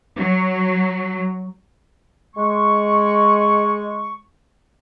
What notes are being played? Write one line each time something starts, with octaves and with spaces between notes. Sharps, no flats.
F#3
G#3 C#6